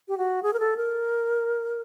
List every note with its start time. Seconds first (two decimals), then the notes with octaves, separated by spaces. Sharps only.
0.08 G4
0.18 F#4
0.43 G#4
0.53 A#4
0.60 A4
0.77 A#4